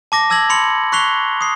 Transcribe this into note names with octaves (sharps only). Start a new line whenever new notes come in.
A5 D6 A#6
A5 E6 G#6 A#6 F#7
B5 C6 C#7 F#7
C#6 F#6 B6 C7 F7 G7
D#6 C7